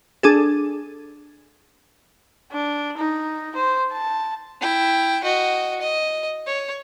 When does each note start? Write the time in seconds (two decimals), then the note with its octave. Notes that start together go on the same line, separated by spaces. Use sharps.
0.23 D4 G#4 A4
2.52 D4
2.97 D#4
3.56 C5
3.92 A5
4.61 E4 G5
5.23 F#4 D#5
5.81 D#5
6.47 C#5